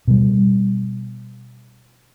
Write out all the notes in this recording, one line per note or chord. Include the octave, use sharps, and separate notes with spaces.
B2 G3